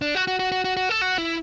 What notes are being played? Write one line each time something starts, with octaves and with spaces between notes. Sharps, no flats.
D4
F#4
F#4
F#4
F#4
F#4
F#4
A4
F#4
E4